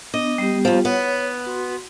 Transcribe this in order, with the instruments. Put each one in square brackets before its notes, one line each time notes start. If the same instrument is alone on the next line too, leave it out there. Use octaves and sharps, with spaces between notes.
[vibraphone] B3 D4 [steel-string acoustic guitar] D#5
[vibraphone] G3 B3 G4
[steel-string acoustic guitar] D#2 F3
[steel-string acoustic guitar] B3 [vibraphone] C#5
[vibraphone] F#4 C6